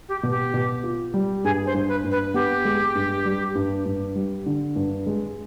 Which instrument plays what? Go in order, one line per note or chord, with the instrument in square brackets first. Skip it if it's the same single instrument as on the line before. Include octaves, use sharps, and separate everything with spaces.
[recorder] G4
[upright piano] B2
[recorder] G4
[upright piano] B2
F4
G3
[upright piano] G2 [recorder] G#4
[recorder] C5
[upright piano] G2
[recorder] B4
[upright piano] G2
[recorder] B4
[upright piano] B3 [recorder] G4
[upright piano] G#3
G2
G3
G2
G2
G3
D3
G2
G#3